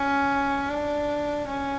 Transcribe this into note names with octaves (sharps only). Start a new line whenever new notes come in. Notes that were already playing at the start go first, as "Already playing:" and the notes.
Already playing: C#4
D4
C#4